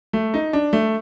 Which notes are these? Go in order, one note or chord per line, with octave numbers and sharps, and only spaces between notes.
A3
D#4
D4
A3